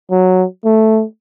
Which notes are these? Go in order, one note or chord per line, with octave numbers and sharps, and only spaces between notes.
F#3
A3